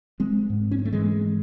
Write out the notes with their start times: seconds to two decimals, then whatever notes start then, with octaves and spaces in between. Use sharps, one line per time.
0.20 G#3 C4
0.50 G#2
0.71 C#4
0.79 C4
0.85 A3
0.93 E3 G#3